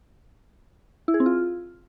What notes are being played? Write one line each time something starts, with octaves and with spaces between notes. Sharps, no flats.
E4
G#4
C4
F4